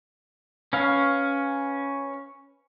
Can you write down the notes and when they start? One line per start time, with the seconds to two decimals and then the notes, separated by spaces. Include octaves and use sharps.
0.73 C#4 B4 F5 F6